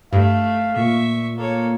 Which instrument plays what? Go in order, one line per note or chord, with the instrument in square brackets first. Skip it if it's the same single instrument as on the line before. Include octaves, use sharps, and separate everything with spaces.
[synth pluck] G2 [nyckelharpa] A3 [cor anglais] F5
[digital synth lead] A#2 [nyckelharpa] E5 C#6
[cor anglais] A#3 [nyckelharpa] A4 C#5